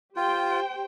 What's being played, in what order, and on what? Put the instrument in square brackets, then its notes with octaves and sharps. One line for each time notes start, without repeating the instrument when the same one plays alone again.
[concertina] F4 [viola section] G4 C5 G5